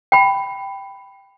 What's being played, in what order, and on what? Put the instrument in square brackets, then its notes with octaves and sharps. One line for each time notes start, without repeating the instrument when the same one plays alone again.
[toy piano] G5 B5